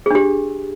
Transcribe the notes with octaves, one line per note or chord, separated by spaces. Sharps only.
D4 G4 G#4